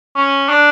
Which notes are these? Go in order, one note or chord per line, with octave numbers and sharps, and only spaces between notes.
C#4
D4